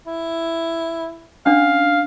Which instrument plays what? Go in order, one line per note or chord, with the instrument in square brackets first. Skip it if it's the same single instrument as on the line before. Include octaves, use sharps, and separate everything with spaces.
[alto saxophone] E4
[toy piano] C#4 D4 [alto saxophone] F5